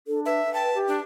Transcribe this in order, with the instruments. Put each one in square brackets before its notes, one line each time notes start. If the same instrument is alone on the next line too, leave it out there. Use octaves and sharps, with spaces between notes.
[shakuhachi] D4 [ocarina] A4
[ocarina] B4 [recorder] E5
[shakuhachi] G5 [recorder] A5
[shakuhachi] G4
[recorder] D4